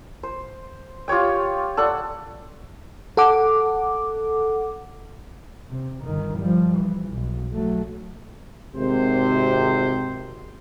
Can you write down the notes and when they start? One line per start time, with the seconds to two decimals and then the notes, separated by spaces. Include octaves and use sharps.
0.23 C5
1.08 F4 G4 C#5 G5
1.77 A4 D5 F#5
3.17 A4 F#5 D6
5.71 C3
6.03 G1 D#3
6.38 F3 G3
6.77 E3
7.09 B1
7.52 F#3 A3
8.76 G#1 C3 C5